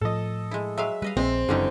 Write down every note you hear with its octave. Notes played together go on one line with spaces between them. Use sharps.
A2 F3 A4 D#5
G#3 E4
F#3 G#3 E5 F5
G3 B4 D#5 F5
A#1 G#3 C4
F#1 F#2 D3 E3 G3 C#4 D#4